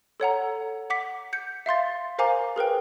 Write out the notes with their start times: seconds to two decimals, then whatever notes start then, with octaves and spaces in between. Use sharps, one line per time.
0.20 A4 C#5 F#5 A#5
0.90 F#5 D6 B6
1.33 G6 C#7
1.66 E5 F5 C6 A6
2.18 A#4 C5 F5 G#5 A#5 D6
2.56 G#4 A#4 B4 G5